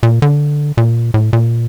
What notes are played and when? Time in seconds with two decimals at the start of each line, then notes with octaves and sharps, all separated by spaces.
0.03 A#2
0.22 D3
0.77 A#2
1.14 A2
1.33 A#2